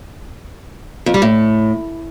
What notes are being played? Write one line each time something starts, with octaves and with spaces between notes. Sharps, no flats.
F2
G3
A2